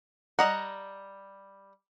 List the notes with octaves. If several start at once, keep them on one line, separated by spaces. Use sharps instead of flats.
G3 D#5 F#5 A#5